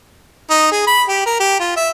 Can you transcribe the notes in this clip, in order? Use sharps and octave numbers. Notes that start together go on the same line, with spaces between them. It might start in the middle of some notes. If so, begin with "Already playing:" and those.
D#4
G#4
B5
G4
A#4
G4
F4
E5